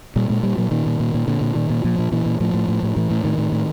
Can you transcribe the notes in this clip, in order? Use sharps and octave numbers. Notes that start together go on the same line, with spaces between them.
A#2 G3
A#2 G#3
A#2 G3
A#2 F#3
A#2 D#3
A#2
A#2
A#2
A#2 D3
A#2
A#2 D#3
A#2
A#2 F3
A#2
A#2 E3
A#2
A2 F3
A2
A2
A2
A2 E3
A2
A2 D#3
A2
A2